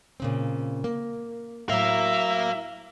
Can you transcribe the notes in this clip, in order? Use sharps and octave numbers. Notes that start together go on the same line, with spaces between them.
A#2 C#3 C4
A#3
A2 F#3 A#4 E5 F5